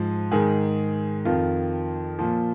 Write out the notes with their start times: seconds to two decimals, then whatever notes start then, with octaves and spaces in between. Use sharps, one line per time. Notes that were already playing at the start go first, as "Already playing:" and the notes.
Already playing: G#2 F3
0.31 G#2 D#3 G#4
1.25 F2 D#3 F4
2.19 A#2 F3